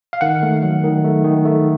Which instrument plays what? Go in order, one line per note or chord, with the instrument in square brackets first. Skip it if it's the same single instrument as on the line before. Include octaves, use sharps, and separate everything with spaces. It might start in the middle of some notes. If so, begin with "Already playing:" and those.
[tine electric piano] F5
D#3 F#5
A3
F#3
D#3
A3
D#3
A3